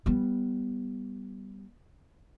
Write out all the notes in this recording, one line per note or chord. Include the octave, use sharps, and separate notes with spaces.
G3 B3